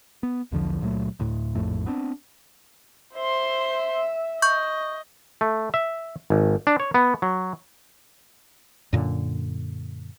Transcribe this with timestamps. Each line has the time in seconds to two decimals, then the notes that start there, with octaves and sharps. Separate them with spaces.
0.23 B3
0.52 B1 E2 D3 F3
0.81 C#2 A#2 F#3 A3
1.20 D2 A2
1.55 A#1 F2 A2 A3
1.86 B3 C4 D4
3.15 C5 E5 C6
4.42 D#5 C#6 G6
5.41 A3
5.74 E5
6.30 G#1
6.67 D4
6.80 C#5
6.94 B3
7.22 F#3
8.93 F#2 A#2 D3